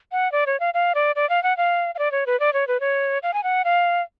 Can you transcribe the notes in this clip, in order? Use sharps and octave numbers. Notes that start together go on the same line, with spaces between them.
F#5
D5
C#5
F5
F5
D5
D5
F5
F#5
F5
F5
D5
C#5
B4
D5
C#5
B4
C#5
F5
G#5
F#5
F5